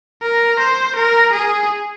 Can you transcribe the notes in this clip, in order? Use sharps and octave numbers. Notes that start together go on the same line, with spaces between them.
A#4
C5
A#4
G#4